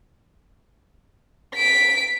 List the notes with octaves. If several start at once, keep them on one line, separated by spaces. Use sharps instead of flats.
B6 D7